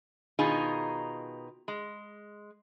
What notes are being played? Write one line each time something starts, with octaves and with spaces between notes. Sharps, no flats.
B2 D#3 D#4 F4 G#4
G#3